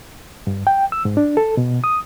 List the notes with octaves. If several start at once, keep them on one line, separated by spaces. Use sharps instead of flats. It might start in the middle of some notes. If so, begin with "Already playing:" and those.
G2
G5
E6
G#2
D4
A4
B2
D#6